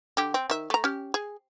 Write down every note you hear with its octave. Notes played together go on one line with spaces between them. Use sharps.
D3 G4
C4
D#3 E5
A3 A#5
C#4 G4
G#4